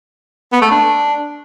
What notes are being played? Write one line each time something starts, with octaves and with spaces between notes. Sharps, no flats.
B3
A3
D4